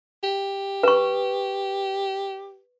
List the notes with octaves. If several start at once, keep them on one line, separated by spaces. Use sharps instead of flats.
G4
B4 C#6